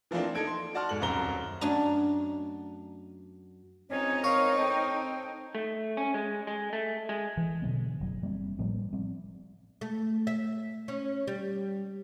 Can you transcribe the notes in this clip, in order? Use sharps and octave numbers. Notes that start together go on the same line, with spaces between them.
E3 F3 A3 A#3 C4 D4
D#4 A4 G#6 D7
C6
F#4 D5 A5 C6 F6
G#2 A4 F#7
D#1 F#2 C4 A#5 G7
F#2 F#3 A3 D4 D#5 A#5
C#2 C4 C#4 D#4 C#5
A#4 C#5 F5
C4 A4 C5 G5
A3
C#4
G#3
G#3
A3
G#3
E3
B2 D3 F#3 B3
F#1 F#3
G3 A#3 C4
A2 F3 G3 B3
G3 C4
A3
E5
C#4
G3